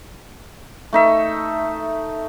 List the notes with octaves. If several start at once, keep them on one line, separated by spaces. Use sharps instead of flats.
A3 D#4 E5